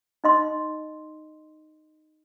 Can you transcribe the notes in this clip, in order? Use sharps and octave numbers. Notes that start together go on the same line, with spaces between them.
D#4 D#5 C6